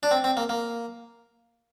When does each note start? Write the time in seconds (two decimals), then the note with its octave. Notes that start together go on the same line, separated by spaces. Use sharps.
0.03 D4
0.11 C4
0.24 C4
0.37 A#3
0.49 A#3